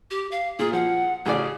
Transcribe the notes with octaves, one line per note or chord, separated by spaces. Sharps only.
G4
F5
A#2 G#4
F3 F#5
A1 C#3 G#4 D5